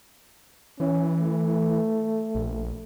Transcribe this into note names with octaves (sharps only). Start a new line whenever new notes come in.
E3 C#4
A3
A#1